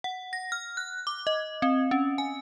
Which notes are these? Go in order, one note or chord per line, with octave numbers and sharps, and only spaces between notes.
F#5
A#6
F6
F#6
D6
D#5
C4
C#4
G#5